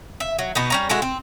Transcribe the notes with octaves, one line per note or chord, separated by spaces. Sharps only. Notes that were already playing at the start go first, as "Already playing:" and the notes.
E5
F#3
B2 B3 D#4
G3 C#4 A#5
D3 G#3 E4 F#4
C4